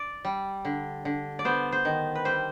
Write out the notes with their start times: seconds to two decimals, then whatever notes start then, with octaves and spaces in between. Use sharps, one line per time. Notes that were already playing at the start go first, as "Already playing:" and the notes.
Already playing: D5
0.25 G3
0.65 D3
1.05 D3
1.39 D5
1.45 B3 C5
1.72 C5
1.85 D#3
2.15 B4
2.25 G3 C5